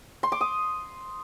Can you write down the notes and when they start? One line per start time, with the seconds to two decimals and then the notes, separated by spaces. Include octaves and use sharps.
0.23 C6
0.32 D6
0.41 D#6